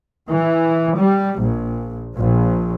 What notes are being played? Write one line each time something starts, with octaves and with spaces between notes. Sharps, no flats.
E3
G3
A#1
A#1